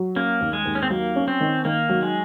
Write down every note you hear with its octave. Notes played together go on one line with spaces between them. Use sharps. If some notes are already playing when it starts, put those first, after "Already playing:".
Already playing: F#3
A#3 C#4
D#2
G#3
D#2
C#4
C4
F#3 A#3
C#4
C4
D#3
D#3 A#3
F#3
G#3